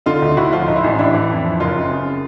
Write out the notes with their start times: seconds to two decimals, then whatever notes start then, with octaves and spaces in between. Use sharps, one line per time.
0.06 D3 D#4 F4
0.22 D2
0.37 D2 E4 F#4
0.52 F3 D#4 F4
0.68 G#2 D#4
0.76 E4
0.84 A1 C#4 D#4
0.99 A1 D4 E4
1.14 E3
1.29 F2
1.45 F3
1.60 F#1 D#4 F4
1.75 C#3
1.90 C#3